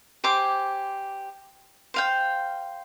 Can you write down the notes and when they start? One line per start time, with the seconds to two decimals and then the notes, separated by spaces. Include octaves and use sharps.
0.24 G4 C5 G#5 D6
1.94 C5 F5 G5